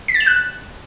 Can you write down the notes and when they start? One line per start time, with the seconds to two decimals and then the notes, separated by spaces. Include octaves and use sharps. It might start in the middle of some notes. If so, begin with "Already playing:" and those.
0.08 B6
0.14 A6
0.20 E7
0.26 F#6